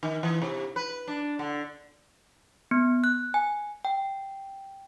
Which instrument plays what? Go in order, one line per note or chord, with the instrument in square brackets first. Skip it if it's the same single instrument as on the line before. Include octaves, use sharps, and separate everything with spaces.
[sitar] D#3
E3
C3
B4
D4
D3
[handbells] B3
F#6
G#5
G5